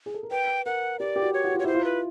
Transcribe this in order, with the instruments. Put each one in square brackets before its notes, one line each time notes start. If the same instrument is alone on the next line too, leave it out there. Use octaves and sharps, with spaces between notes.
[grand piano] G#4
A4
A#4
[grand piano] B4 [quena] G5
[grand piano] A#4 [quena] F#5
[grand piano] G4 [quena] D5
[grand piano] G4
F#4
[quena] C#5
[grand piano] F#4
F4
[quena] C#5
[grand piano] E4 [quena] C5
[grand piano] F4
[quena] B4